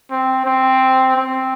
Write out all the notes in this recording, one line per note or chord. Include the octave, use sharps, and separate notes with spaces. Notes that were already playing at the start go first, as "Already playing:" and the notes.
C4
C4
C4